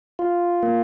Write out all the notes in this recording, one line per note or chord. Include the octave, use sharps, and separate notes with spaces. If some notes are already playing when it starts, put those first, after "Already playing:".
F4
A#3